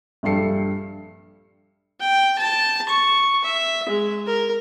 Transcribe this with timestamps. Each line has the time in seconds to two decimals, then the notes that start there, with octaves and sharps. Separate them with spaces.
0.23 A#1 G2 G3 A4 C7 C#7
2.00 G5
2.39 A5
2.89 C#6
3.44 E5
3.89 G#3
4.27 A#4